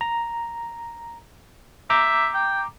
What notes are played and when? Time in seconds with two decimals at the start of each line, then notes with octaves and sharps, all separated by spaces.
0.01 A#5
1.90 E5 A#5 D6 G6
2.34 G5